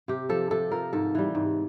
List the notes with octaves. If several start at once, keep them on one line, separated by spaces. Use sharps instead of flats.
C3 G4
F3 A4
C3 A4
F3 A#4
G#2 A4
E3 G3
G#2